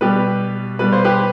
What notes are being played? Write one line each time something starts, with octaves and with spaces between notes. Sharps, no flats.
B2 G3 G4 B4
B2 G3 B4
C5
G4 B4